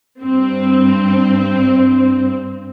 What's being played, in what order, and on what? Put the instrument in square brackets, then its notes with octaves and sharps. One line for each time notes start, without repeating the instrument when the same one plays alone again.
[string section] G2 C4